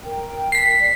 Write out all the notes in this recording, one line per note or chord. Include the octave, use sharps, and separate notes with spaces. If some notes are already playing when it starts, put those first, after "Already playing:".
A#4 G5
B6 C7
D5